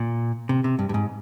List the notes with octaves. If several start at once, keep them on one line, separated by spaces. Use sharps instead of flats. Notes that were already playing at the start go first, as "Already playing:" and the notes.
Already playing: A#2
C3
C3
G2
G2
G#2